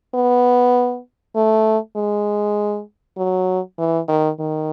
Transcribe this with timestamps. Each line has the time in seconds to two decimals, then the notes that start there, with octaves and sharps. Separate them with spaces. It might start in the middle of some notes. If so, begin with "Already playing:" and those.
0.14 B3
1.35 A3
1.96 G#3
3.17 F#3
3.78 E3
4.08 D#3
4.39 D#3